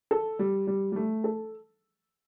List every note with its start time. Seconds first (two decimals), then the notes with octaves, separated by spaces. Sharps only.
0.11 A4
0.39 G3
0.67 G3
0.92 G3
0.96 A3
1.24 A4